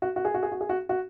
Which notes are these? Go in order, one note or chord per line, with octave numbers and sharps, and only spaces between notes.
F#4
F#4
G#4
F#4
G#4
F#4
G#4
F#4
F#4